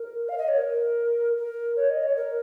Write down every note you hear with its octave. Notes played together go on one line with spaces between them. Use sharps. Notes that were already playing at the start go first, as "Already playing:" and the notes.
Already playing: A#4
F5
D#5
C#5
A#4
A#4
C#5
D#5
C#5
A#4